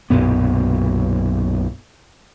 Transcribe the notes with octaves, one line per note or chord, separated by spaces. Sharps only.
B1 F#2 A#2 B3